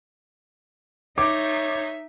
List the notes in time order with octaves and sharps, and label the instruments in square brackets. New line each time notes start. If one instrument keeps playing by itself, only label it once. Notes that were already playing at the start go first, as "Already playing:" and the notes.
[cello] D#4 [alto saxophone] C#5 [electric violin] E5 [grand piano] D6